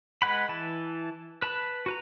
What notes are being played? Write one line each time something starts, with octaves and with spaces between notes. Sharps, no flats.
G#3 B4 F#5 B5
E3 A5
B4 A5 B5
F#4 B4 A#5